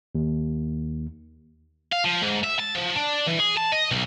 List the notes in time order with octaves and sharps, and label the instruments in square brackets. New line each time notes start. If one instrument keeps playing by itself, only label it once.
[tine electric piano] D#2
[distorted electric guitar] F5
F3
G#2
E5
A5
F3
D4
E3
G#4
A5
D#5
B1